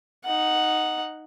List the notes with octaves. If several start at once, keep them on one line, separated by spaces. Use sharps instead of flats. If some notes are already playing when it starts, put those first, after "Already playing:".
D#4 F#5